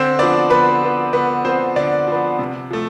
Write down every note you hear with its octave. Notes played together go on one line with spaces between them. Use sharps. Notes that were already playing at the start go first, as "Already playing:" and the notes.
Already playing: D3 C4 C5
F3 B3 D4 D5
D3 B3 B4
F3 B3
D3 B3 B4
F3 B3 C4 C5
D3 D4 D5
F3 B3
C3
F3 A3